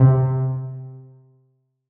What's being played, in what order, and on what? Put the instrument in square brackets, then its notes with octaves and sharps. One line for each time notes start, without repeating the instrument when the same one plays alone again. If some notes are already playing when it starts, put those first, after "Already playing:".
Already playing: [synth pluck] C3